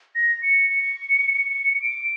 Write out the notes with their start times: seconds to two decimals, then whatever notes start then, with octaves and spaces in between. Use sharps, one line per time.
0.15 A#6
0.43 C#7
0.70 C#7
1.81 D7